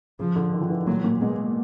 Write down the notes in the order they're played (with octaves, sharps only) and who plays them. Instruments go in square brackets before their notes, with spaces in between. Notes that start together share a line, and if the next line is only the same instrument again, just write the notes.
[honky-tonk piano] C#3 [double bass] F3
[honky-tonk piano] D3
D#3
F3
E3
[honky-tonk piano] A#2 [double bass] F#3
[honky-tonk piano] A#2
[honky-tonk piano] B2 [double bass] G#3